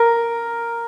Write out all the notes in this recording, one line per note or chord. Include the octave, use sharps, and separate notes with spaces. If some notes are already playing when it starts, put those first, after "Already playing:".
Already playing: A#4